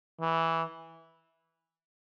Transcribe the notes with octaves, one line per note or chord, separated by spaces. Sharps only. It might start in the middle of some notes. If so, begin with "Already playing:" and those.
E3